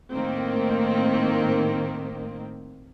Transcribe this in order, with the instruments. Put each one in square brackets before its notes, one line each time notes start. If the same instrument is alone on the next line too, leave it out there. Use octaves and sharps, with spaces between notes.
[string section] A2 D#3 A#3 C4